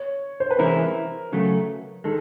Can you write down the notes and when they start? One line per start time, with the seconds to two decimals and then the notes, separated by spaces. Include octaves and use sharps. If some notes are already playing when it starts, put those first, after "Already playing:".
Already playing: C#5
0.40 C5
0.51 B4
0.59 C3 E3 G#3 C#4 E4 A#4
1.32 C#3 F#3 A3
2.04 D#3 G#3 A4